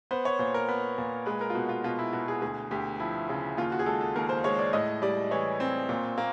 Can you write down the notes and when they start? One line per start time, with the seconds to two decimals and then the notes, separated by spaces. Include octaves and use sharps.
0.11 B3 C5
0.25 C#5
0.39 A#2 C5
0.54 A#4
0.68 B3
0.98 A#2
1.26 G#3 B4
1.41 A#4
1.50 F4
1.55 B2 F#4
1.69 F4
1.84 B2 F4
1.99 E4
2.13 B2 F#4
2.28 G#4
2.41 D2 G#4
2.71 D2 G4
3.00 F3 E4
3.29 C#3
3.57 D#2 F4
3.72 F#4
3.79 G#4
3.86 G#3 A4
4.01 A4
4.16 D#2 A#4
4.29 C5
4.44 G#3 C#5
4.59 D5
4.73 A2 D#5
5.02 G3 D5
5.31 E3 C#5
5.60 C4
5.89 A#2
6.18 A#3